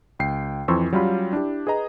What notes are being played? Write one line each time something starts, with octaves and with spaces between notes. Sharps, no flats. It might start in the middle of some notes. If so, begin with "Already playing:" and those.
C#2 G5 C7
F2 E3 C4 C6 C#6 E6
F#3 G3 C#4 F4 F5 B5
D4 E4 G4
G#4 B4 D#5 A#5